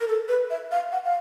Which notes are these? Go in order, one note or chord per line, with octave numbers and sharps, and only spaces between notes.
A#4
A4
B4
E5
F5
F#5
F5